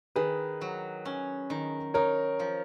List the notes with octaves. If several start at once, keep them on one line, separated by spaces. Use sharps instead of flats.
D#3 G#4 B4
F#3
C#4
D#3
D#4 A#4 C#5
F3